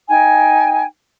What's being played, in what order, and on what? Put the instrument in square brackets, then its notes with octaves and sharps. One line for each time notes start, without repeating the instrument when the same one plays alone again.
[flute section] D#4 G5 G#5